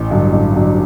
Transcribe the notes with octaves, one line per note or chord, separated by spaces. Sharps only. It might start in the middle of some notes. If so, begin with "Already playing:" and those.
Already playing: A1
G2 D3 F#3
A1
G2 D3 F#3